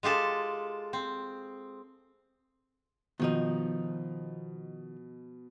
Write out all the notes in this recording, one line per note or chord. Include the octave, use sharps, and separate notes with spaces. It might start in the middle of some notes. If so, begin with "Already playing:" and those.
G#3 F4 G4 A4
C4
B2 D#3 F3 D#4